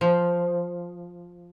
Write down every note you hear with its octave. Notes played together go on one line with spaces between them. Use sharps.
F3